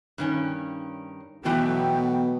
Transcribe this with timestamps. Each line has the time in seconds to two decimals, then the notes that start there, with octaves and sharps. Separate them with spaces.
0.18 G2 D#3 C#4
1.45 B2 E3 F#3 A3 B3 G5